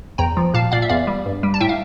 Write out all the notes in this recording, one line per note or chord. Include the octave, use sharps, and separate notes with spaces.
E2 G5 A#5
F3
A#2 F5 A5
A#2 D5 F5
E5
E2 D5 F5
G3
G2
G3
A5
A2 E5 G5
F5